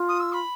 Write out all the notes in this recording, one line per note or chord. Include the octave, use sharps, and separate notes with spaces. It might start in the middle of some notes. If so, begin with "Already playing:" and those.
Already playing: F4
D#6
E6
B5